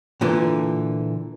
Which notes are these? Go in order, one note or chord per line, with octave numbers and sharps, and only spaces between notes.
A#2 D3 E3